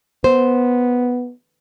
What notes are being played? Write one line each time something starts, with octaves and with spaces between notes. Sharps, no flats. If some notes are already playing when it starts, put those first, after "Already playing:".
B3 C5